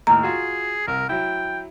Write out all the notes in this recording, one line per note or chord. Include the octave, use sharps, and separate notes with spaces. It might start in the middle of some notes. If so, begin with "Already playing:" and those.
D#2 A2 A#5 F6
F4 F#4 G#4
C2 A#4
F#3 E4 G5